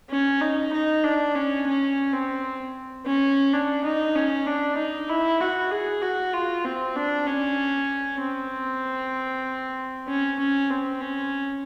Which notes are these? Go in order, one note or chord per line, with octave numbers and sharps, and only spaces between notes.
C#4
D#4
D#4
D4
C#4
C#4
C4
C#4
D4
D#4
C#4
D4
D#4
E4
F#4
G#4
F#4
F4
C4
D4
C#4
C4
C#4
C#4
C4
C#4